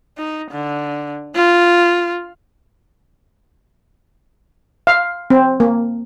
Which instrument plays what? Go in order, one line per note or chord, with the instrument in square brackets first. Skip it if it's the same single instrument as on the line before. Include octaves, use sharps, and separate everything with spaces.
[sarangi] D#4
D3
F4
[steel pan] F5
C4
A#3